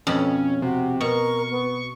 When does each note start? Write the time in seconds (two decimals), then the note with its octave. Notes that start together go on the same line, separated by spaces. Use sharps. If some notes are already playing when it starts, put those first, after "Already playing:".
0.07 F2 B2 C#4 B5
0.62 C3 F#4
1.01 B2 A#4 C#6
1.51 B3